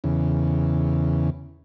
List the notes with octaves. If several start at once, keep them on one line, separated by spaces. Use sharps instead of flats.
E2 C#3